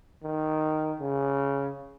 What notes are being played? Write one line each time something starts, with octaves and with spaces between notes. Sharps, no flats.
D#3
C#3